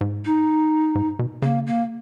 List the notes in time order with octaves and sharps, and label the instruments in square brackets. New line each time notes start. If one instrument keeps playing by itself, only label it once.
[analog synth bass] G#2
[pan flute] D#4
[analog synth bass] G#2
B2
[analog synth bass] C#3 [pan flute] A#3
[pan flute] A#3